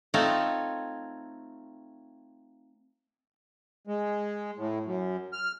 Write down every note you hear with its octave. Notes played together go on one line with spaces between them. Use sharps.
A3 C4 D#4 F4 A4 C#5
G#3
A2
F#2
F6